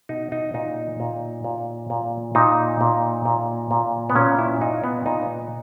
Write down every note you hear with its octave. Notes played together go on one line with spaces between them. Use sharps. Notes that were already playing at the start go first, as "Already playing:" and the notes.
B2 D#4
D#4
A#2 D#4
A#2
A#2
A#2
A#2 D#4
A#2
A#2
A#2
B3
A#2 C#4
E4
A#2 D#4
B3
A#2 D#4